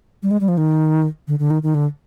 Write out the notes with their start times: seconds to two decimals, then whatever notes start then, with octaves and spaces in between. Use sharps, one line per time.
0.23 G3
0.31 G#3
0.41 G3
0.48 F3
0.57 D#3
1.28 D3
1.39 D3
1.50 D#3
1.63 D#3
1.75 D3